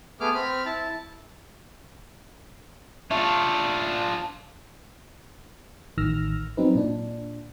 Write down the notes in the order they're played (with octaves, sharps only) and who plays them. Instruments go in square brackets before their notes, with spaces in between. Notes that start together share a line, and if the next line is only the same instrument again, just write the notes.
[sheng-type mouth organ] A3 B3 G#4 D6 F6
C4 B5 F6
E4 A5
[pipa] A3 [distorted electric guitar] D4 F4
[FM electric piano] A1 D#3 E6 F6 A#6
F#3 C4 D#4 B4
A#2 D4